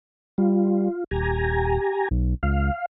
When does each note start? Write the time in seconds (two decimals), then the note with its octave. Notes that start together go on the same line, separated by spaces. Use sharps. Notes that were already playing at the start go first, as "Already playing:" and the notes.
0.38 G3 F4
1.11 D#1 G4 G#5 A#5
2.11 B1
2.43 C#2 F5